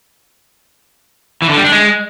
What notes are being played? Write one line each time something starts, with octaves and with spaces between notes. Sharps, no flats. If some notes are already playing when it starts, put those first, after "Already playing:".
E3
D3
G3
D4
G#3